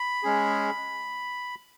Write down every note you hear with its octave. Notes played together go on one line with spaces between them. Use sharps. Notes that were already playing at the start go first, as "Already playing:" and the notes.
Already playing: B5
G#3 C#4 G#4